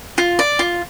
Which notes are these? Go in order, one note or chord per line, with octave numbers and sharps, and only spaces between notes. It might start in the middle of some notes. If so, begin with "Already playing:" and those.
F4
D5
F4